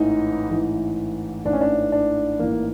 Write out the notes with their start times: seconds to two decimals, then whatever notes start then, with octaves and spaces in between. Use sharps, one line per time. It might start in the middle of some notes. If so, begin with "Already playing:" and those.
Already playing: A1 G#2 E3 D#4
0.50 A1 G#2 E3
1.45 A1 G#2 E3 D4
1.53 C#4
1.61 D4
1.92 D4
2.39 A1 G#2 E3 A#3